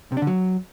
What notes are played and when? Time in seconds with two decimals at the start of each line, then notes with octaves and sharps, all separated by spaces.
0.12 C3
0.17 D4
0.22 D3
0.27 F#3